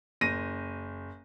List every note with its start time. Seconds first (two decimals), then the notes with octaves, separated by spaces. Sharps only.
0.21 F#1 A#6 D#7